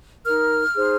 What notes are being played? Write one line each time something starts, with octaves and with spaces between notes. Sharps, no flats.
D#4 A#4 F6
D#4 G#4 C5